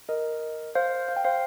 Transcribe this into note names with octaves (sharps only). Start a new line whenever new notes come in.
A#4 D#5
C5 F5
F5
G5
C5 F5